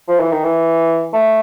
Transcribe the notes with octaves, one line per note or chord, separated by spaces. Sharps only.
F3
E3
D#3
E3
A3